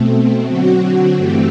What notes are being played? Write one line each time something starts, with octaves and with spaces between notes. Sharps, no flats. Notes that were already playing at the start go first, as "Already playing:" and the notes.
Already playing: B2 A3 C4
D3 F#3 C4 F#4
G2 E3 A3 C4 G4